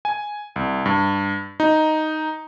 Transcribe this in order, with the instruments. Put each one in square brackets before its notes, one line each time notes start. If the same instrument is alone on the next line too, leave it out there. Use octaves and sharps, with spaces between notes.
[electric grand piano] G#5
C2
G2
D#4